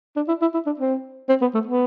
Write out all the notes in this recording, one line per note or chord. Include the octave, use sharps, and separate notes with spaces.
D4
E4
E4
E4
D4
C4
C4
B3
A3
B3